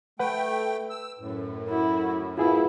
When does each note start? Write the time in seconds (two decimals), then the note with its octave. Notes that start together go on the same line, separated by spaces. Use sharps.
0.19 A3 B4 F#5 G5
0.90 E6
1.19 F#2 A2
1.69 E4 F#4
2.38 B3 E4 F4 G#4 E5